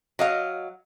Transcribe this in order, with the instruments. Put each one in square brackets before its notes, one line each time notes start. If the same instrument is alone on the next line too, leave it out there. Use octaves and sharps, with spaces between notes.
[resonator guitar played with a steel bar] F#3 D#5 F5